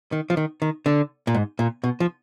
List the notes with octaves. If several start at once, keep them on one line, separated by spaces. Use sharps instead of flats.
D#3
F3
D#3
D#3
D3
A#2
G#2
A#2
B2
F3